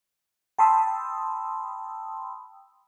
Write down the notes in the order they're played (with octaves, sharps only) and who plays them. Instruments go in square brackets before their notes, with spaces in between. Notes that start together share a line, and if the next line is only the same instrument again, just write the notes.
[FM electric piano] G5 A5 B5 C6 D#6 E6